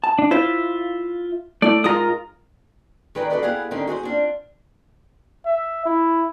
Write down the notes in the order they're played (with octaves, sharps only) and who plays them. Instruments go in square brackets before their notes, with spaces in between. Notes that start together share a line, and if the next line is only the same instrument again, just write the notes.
[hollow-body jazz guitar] A5
[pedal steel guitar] D4
[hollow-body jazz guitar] E4 C5 [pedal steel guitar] F4 E5
[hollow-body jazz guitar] A3 E4 [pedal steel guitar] D5
[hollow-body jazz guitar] G#2 G#3 F4 [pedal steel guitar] A#4 A#5 D#6
[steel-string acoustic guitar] D#3 G#4 B4 D5 G5 A#5
D#3 F#4 A4 B4 D5 D#5
B3 E4 G4 G#4 F5 F#5
D3 D#3 G3 C4 C#4 D#4
F#4 G#4 B4 C5
C4 D4 F4
[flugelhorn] E5
E4